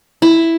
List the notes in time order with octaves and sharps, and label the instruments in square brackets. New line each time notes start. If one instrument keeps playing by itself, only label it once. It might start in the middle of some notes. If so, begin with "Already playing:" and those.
[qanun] E4